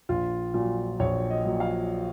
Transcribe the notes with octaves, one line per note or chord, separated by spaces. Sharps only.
A#1 F4
A#2 F#3 F4
A#1 C#5
D#5
A#2 F#3
F5